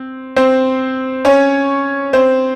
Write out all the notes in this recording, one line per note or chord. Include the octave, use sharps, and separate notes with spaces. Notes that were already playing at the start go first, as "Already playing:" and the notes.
Already playing: C4
C4 C5
C#4 C#5
C4 C5